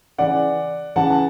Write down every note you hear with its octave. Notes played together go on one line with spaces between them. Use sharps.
C#3 E3 D5 F#5
C#3 E3 F#5 A5
A5